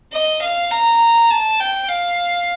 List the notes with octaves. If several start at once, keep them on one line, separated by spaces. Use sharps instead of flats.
D#5
F5
A#5
A5
G5
F5